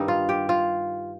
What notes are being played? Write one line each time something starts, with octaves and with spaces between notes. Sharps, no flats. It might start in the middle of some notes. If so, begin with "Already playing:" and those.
Already playing: G2 D#3 G3 D#4
F4
G4
F4